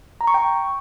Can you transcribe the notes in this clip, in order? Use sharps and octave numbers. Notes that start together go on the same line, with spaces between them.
A#5
C#6
G5